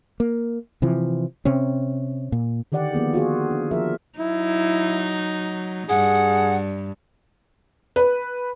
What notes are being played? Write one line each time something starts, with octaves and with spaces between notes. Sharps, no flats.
A#3
C3 E3 F3
C3 C4 C#4
A#2
D3 D#3 G4 D5 F#5
F3 A#3 B3 G#4
F4 F#4 G#4
D4
F3 G#4 A#4 E5
F#3 D#4 E4
G2 G#4 F#5
B4